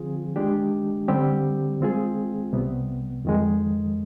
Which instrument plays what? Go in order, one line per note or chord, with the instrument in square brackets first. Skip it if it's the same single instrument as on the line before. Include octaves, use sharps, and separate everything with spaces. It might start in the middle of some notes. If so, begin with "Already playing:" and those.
Already playing: [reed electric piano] D3 F3 C4 F4 G#4
D#3 G#3 D4 G4
D3 G3 C4 G4
D#3 G#3 C4 F4 G#4
C2 C3 G3 B3
F2 D#3 G#3